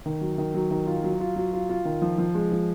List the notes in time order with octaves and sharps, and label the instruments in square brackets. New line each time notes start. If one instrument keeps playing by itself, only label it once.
[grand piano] D#3
F#3
D#3
F#3
D#3
F4
F#3
F4
F#3
F4
F4
D#3
F3
F3
G#3
F3